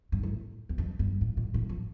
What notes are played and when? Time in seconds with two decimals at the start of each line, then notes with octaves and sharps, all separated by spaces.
0.12 G2
0.23 A2
0.69 E2
0.78 F2
0.99 G2
1.21 A2
1.37 A#2
1.54 A2
1.69 F3